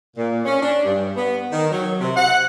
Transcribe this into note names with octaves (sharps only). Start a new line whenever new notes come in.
A#2
C#4
D4
G2
B3
D#3
F#3
C3
F#5